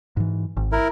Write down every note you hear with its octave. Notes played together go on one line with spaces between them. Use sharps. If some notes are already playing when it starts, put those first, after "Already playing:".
G#2 E3
G#1
E4 A#4